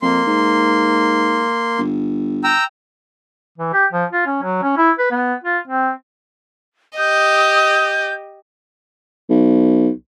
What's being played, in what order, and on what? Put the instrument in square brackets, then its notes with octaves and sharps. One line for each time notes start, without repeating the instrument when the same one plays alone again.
[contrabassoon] F2 [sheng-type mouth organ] A#3 C6
[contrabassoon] G#2
G1
[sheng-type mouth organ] G5 A#5 E6
[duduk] E3
G4
F3
F4
C#4
F#3
C#4
E4
B4
B3
F4
C4
[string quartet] G4 D#5 [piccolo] D#6 [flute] G6
[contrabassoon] B1